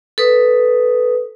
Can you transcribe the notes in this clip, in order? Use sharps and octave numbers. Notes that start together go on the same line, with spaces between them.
A4 B4 D#6